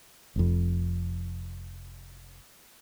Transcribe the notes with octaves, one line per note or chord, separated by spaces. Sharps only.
F1 F2